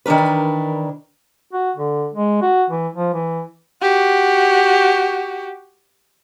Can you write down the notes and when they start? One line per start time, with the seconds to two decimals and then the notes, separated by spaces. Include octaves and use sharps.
0.06 D#3 E3 D4 A#4 B4
1.53 F#4
1.76 D3
2.14 G#3
2.42 F#4
2.70 E3
2.96 F3
3.13 E3
3.82 F#4 G4